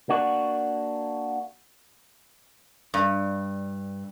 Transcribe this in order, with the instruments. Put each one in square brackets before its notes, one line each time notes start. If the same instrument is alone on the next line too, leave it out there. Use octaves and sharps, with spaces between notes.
[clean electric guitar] A#3 D4 F#4
[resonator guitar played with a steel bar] G2